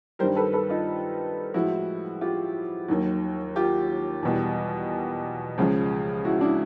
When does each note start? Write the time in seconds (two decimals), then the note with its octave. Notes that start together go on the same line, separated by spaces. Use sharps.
0.19 G2 D#3 G3 A#4 C5
0.36 A4 B4
0.53 A4 B4
0.70 D#4 F4
1.54 A2 F3 G#3 E4 F#4
2.21 F4 G4
2.88 D#2 D#3 F#3
3.56 F4 G4
4.23 E2 B2 G3
5.58 C#2 C#3 F3 G#3
6.25 E4 F#4
6.41 D4 E4